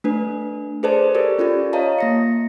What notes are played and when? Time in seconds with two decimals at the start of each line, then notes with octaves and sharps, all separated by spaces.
0.04 A3 D4 B4
0.83 G#4 A4 B4 C5 D5 A5
1.15 G4 A4 A#4 D5
1.38 C#4 F4 G4 D5
1.73 C#5 D#5 F5 A5 A#5
1.99 A#3 A#6 C#7